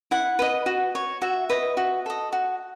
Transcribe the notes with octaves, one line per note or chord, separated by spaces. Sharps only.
E4 F#5
B4 D#5
F#4
C#5
F#4 E5
B4 D#5
F#4
A4 D#5
F#4